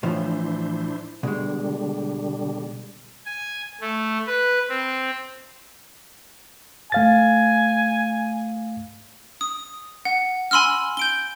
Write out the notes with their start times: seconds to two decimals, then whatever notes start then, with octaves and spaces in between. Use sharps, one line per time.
0.03 A2 E3 F3 D4 E4 C5
1.23 B2 D3 G3 G#3
3.25 G#5
3.81 A3
4.27 B4
4.69 C4
6.92 A3 F5 G#5 A6
9.41 D#6
10.05 F#5
10.51 G#5 B5 C6 E6 F6
10.97 G6 D7 G7